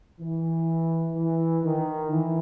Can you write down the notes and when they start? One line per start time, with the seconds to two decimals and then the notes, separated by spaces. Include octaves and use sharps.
0.19 E3
1.15 E3
1.63 D#3
2.11 E3